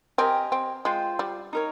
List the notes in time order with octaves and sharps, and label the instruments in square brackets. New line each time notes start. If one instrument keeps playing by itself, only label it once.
[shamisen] C4 [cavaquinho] G4 A#4 D#5 G#5
[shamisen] C4
[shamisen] G#3 [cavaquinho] F4 C5 G5
[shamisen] G3
[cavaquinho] D#4 A#4 C#5